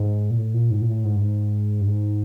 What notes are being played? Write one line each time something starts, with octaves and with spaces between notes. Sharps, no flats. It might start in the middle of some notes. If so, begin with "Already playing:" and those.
Already playing: G#2
A#2
A2
A#2
G#2
A#2
A2
G#2
G2
G#2
G2
G#2